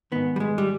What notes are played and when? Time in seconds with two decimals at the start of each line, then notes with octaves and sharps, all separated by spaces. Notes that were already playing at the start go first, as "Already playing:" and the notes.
0.12 G#2 D#3 B3
0.36 G3
0.40 G#3
0.58 G3